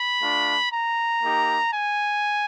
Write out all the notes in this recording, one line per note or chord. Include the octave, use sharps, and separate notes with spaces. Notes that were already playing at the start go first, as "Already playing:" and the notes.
Already playing: B5
A3 D4 F4
A#5
A#3 D#4 G4
G#5